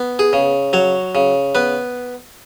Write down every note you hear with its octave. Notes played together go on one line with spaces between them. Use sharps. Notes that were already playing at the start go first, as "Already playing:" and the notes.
Already playing: B3
G#4
C#3
F#3 C#5
C#3
B3 B4